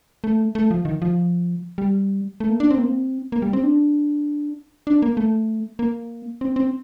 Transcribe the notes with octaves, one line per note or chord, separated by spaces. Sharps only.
A3
A3
F3
D#3
F3
G3
A3
A#3
D4
C4
A#3
C4
A#3
G3
C4
D4
D4
A#3
A3
A#3
C4
C4